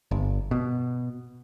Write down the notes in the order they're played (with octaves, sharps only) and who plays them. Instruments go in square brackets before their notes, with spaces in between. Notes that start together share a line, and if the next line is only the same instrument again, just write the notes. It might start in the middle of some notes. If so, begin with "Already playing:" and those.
[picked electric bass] G1
B2